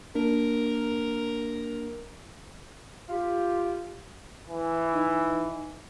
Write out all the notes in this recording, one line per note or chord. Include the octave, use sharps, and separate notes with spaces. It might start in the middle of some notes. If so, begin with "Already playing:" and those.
A#3 D4 A#4
F4 G4
E3
D#4